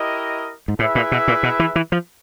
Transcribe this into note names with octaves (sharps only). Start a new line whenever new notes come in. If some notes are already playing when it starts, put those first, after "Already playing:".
Already playing: E4 G4 A#4 D#5
G#2
A2 E4 G#4 B4 E5
A#2
B2
A#2
B2
E3
E3
F3